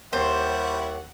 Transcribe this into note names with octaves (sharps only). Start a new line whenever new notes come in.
D#2 G3 E4 C5 C#5 F#5